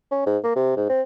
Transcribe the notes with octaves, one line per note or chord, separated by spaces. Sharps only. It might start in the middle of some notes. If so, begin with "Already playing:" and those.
C#4
G#2
A#3
C3
G#2
C4